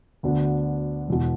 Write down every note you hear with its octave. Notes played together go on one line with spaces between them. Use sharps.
D2 D3 B3 D4 F#4
E1 E2 B2